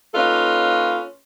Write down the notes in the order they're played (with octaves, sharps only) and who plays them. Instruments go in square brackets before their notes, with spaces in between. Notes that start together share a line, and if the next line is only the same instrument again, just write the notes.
[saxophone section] A#3 C#4 D#4 F4 A4 B4